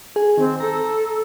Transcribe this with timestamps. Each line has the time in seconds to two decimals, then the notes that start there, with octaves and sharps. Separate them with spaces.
0.16 G#4
0.38 D#3 C4
0.60 A4 A#5